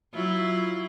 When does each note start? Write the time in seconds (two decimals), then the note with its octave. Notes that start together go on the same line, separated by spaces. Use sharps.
0.14 F#3 E4 F4